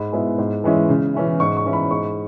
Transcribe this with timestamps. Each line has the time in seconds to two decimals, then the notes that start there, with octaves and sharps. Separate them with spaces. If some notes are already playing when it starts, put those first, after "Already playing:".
Already playing: G#2 B5
0.13 G#3 B3 E4
0.38 G#2
0.64 E3 G#3 C#4 E4
0.89 C#3
1.14 E3 C#4 E4
1.40 G#2 C#6
1.57 C#6
1.65 E3 C#4 E4
1.73 B5
1.91 G#2 C#6